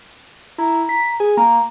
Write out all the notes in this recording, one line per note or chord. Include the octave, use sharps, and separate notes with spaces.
E4 A#5
B6
G#4 G#5
A#3 A#5